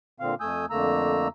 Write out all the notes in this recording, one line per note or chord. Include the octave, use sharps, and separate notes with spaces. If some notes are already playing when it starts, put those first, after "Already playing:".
A#2 D3 C4 F5
F2 A3 G#5 D#6 E6 G6
F2 D3 A3 A#3 A#5 E6